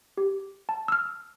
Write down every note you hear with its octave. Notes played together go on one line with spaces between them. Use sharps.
G4
A5
E6 F6